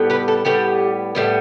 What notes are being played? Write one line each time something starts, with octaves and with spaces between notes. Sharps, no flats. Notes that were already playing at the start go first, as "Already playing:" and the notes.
Already playing: A2 G3 B3
G4 B4
A4
A2 G3 B3 G4
A2 G3 B3